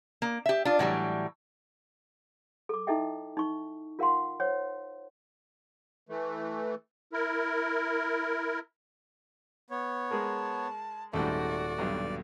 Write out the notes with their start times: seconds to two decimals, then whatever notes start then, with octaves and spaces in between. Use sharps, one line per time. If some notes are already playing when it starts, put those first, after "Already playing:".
0.22 A#3
0.46 G4 E5
0.65 D4 F4
0.79 A2 E3 F#3 G3
2.69 A4 D6
2.87 D#4 E4 A4 D#5 E5 G5
3.37 D#4 C#6
3.99 F4 A#4 F5 F#5 C6
4.40 C5 C#5 F#5
6.09 E3 A3
7.13 E4 A#4
9.70 B3 C#5
10.11 G#3 G#4 A#4 A5
11.13 D#1 G#2 G3 A3 F#4 A4 D5 A#6
11.78 B1 G2